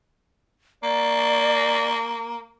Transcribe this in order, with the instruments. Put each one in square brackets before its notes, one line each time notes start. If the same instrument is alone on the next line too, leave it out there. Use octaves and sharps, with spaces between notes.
[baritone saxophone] A#3 [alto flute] D5